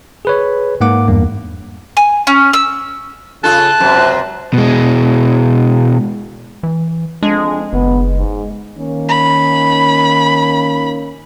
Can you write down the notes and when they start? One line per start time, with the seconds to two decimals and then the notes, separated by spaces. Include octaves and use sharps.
0.25 G#4 B4 C#5
0.81 G#2 A#3 F#5 D6
1.08 E2 G2 A#3
1.97 G#5
2.27 C#4
2.53 E6
3.44 C#3 F4 A4 A5 F#6
3.80 C#2 F#2 C3 C5
4.53 B2 G#3
6.63 E3
7.23 F2 G#3 D4
7.73 F#1 B3
8.18 G#2
8.77 D#3 A#3 C#4
9.08 B5